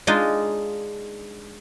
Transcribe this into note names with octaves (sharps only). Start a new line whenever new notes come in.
G#3 D4 D#4 F4